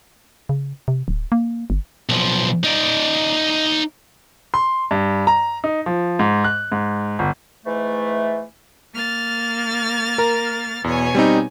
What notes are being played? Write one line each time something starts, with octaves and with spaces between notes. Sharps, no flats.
C#3
C3
D1
A#3
G1
B1 F3
D#4 D5
C6
G2
A#5
D#4
F3
G#2
F#6
G#2
G1
G#2 E3 A3
A#3 F6 A6
A#4 A#5
E2 B2 C#5 G#5
G3 C4 D#4